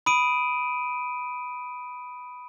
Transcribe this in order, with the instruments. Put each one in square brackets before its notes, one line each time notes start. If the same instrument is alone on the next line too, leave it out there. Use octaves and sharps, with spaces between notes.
[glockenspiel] B5 D#6 D7 D#7